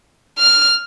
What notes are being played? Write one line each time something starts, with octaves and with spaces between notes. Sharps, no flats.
F6